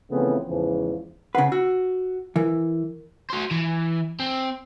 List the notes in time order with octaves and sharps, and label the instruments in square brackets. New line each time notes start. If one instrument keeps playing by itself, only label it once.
[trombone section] C#3 E3 F3 A3 B3 C4
E2 G#2 C#3 E3 F3
[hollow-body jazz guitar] C#3 B4 [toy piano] F#5
[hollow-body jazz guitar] F#4 [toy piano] E6
[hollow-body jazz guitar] E3 [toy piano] A#4
[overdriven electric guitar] F#4 C5
E3
C4